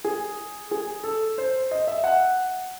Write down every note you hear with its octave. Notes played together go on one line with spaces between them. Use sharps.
G#4
G#4
A4
C5
D#5
E5
F#5